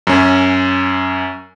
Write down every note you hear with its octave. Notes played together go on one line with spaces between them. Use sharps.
F#2 C#4